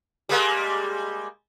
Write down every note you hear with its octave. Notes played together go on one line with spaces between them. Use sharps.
G3 G#3 A#3